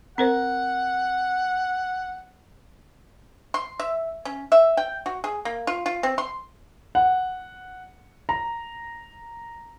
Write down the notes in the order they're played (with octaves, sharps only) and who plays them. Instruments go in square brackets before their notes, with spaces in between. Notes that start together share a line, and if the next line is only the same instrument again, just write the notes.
[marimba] C4 A#4 C5 [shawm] F#5
[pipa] C6
E5
C#4
E5
G5
F#4
G#4
A#3
F4
F4
C4
C6
[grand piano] F#5
A#5